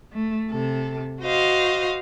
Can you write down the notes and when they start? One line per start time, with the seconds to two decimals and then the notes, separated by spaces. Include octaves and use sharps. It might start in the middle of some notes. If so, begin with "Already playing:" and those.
0.12 A3
0.51 C3 A4
1.23 F#4 C5 D#5 F5